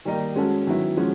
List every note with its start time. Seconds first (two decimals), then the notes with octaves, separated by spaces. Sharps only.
0.05 D#3 G3 A#3 D#4
0.36 G#3 C#4 F#4 A4
0.67 D#3 F#3 B3 E4
0.97 F3 G#3 C#4 F#4